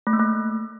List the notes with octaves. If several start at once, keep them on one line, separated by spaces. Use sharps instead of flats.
A3
A#3
A3